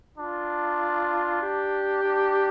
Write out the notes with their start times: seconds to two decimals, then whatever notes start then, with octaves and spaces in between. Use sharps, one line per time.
0.18 D4 F4
1.42 G4
2.04 D4